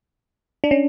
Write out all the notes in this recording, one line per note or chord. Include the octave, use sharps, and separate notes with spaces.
D4
C#4